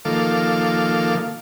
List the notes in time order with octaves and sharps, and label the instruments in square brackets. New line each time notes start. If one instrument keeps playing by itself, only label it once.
[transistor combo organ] D#3 F3 A#3 A4 F5 D6